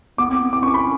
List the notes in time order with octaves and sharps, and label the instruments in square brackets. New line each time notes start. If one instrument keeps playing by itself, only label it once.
[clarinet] B3 [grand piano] D6
[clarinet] C4
B3
[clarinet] C4 [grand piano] D6
[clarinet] C#4 [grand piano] C#6
[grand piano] B5